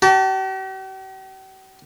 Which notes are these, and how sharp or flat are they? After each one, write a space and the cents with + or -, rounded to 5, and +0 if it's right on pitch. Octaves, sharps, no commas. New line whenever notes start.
G4 -45 A5 +10